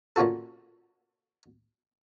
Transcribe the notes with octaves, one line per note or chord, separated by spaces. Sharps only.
A#2 C#4 F4 F#4 A4